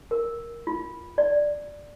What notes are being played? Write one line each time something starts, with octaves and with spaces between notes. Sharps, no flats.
A#4
F4
D5